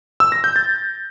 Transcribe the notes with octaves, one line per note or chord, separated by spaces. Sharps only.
E6
A#6
G6
A6